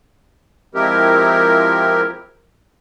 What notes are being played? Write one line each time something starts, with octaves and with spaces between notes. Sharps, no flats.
F3 G#3 C4 E4 G4 A#4